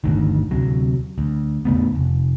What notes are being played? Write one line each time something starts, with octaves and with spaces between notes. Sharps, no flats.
G1 D2 D#3
D2 C3 F#3
D2
E2 C#3 A3 B3
F1